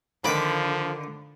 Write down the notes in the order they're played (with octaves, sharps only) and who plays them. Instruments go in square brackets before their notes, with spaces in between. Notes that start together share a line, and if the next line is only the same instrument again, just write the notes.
[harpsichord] A#2 D#3 B4 [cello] D3 [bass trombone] F3 [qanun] B5 D6